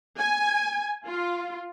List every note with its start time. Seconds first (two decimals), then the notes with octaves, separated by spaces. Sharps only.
0.18 G#5
1.06 F4